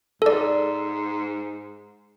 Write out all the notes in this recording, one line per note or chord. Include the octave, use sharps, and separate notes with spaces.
G#2 A4 D5